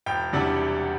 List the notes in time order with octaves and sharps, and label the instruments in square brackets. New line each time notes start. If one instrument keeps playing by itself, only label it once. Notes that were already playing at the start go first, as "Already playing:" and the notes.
[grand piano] E1 G5
E2 C3 G3 D4